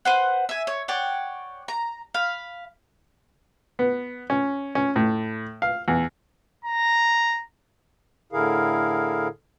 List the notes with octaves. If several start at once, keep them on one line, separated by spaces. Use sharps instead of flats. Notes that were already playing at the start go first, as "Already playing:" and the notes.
B4 C5 F#5
E5 G#5
C#5
C#5 D5 F#5 G5
A#5
F5 B5
B3
C#4
C#4
A2
F5
E2
A#5
A2 D3 E4 G#4 A#4 F5